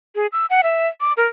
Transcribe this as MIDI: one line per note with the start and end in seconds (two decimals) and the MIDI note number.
0.16 0.27 68
0.33 0.46 88
0.50 0.61 78
0.63 0.87 76
1.01 1.13 86
1.17 1.27 70